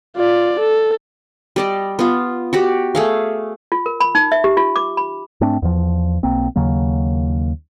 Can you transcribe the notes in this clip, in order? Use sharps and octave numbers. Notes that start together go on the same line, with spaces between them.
F4 D5
A4
G3 D5 D#5
B3 F4
F#4 G4 D5
A3 G#4 F5
F4
A#4
B5
D#4
E5
G4
F4
D6
B5
G#2 A3 C4 D4
E2 F3
B1 A#3 C4
D#2 C#3 F#3 A#3